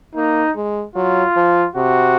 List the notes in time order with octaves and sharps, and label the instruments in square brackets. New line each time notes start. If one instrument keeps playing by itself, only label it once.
[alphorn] A#3 [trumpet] D#4
[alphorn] G#3
[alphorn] F#3 [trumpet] F4
[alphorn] F3
[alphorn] C3 [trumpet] F#4